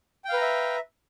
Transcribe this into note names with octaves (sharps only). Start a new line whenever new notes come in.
B4 E5 F5 G5 A#5